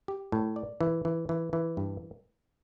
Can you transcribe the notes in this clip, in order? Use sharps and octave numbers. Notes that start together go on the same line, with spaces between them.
G4
A2
D5
E3
E3
E3
E3
G2